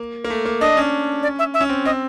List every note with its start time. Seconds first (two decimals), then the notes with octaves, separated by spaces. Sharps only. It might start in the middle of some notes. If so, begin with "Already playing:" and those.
Already playing: A#3
0.25 A#3
0.30 A3
0.46 A#3
0.61 D4 D#5
0.77 C#4
1.23 D5
1.39 E5
1.54 E5
1.61 C#4
1.69 C4
1.85 C4 D#5